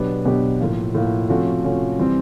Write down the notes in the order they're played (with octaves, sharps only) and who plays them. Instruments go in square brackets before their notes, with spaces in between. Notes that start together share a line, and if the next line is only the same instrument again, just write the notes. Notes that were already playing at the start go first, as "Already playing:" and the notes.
Already playing: [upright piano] B2 F#3 B3 D4 G4
B2 F#3 B3 D4 G4
A2 F3 A#3
A2 F3 A#3
C3 F3 A3 C#4 F#4
C3 F3 A3 C#4 F#4
C3 E3 G3 C4